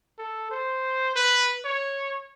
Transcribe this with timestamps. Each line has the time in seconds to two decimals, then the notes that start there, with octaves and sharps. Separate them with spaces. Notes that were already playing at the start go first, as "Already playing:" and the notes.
0.19 A4
0.51 C5
1.15 B4
1.65 C#5